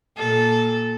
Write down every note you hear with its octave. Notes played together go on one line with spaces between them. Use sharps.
A#2 A4